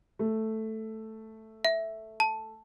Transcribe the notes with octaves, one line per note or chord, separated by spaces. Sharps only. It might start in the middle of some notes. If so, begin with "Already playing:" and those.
A3
E5
A5